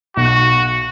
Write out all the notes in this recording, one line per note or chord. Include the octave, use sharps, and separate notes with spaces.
B1 F#4